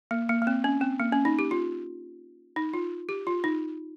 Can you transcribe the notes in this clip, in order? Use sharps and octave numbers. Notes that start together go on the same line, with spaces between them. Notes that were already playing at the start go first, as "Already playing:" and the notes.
A#3
A#3
A#3
C4
C#4
C4
A#3
C#4
D#4
G4
F4
D#4
F4
G4
F4
D#4